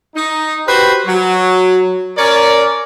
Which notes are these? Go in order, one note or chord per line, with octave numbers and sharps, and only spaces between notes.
D#4
F#4 G4 B4 C5
F#3
C#4 A#4 C#5 D5